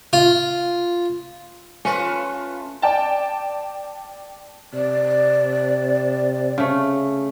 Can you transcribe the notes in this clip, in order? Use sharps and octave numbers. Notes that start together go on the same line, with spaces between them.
F4
A3 C#4 F4 B4
D5 G5 A5
C3 D5
C#3 A3